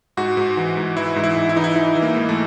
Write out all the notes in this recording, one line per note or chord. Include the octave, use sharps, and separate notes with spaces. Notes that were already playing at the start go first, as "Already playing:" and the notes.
G#2 F#4
G#2
E3
G#2
E3 E4
G#2
E4
G#2
E4
E3 D#4
E4
E3 E4
E3
A#3
G#2
A3